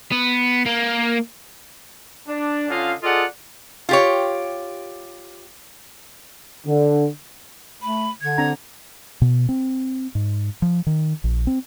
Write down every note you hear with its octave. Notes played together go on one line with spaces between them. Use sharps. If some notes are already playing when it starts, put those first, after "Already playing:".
B3
A#3
D4
D3 C#4 F4 D#5 F5
F4 G#4 A4 D5 D#5 F#5
F4 G4 C#5
D3
A3 B5
D3 G#6
C4 D4 A#5
B2
C4
G#2
F3
D#3
A#1
C4